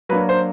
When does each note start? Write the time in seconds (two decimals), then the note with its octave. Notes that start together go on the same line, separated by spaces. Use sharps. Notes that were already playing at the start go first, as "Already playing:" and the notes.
0.09 F#3 A#3 D4 B4
0.29 C5